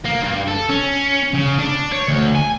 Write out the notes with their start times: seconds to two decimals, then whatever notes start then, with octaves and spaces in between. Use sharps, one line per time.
0.05 A#3
0.22 G2
0.48 A4
0.69 C#4
1.34 C#3
1.59 D4
1.92 C#5
2.08 D2
2.35 G#5